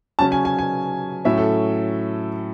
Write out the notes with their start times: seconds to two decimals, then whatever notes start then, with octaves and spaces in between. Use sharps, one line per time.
0.19 C#3 F#3 C#4 A5
0.32 G#5
0.45 G#5
0.59 G#5
1.25 A2 F#3 C#4 E5
1.38 A4